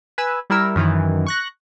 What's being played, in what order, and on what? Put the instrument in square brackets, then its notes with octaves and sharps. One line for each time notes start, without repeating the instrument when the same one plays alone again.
[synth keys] B4 G#5 E6
G3 E4 A#4 E6
F#2 D#3 E3
C#6 F#6 A#6